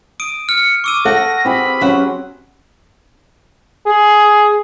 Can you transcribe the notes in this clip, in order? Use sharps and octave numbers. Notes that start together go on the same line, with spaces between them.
D#6 D7 D#7
F6 C#7
C#6 D6 E6 D#7
A4 F#5 A#6
C4 G4 G#4 B5
F#3 C#4 F#5
G#4